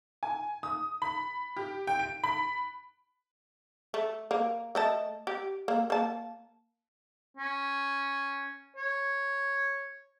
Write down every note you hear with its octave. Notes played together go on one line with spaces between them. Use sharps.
G#5
D#6
B5
G4
G5
D7
B5
A3
A#3
A3 D#5 A5
G4
A#3
A#3 A5
C#4
C#5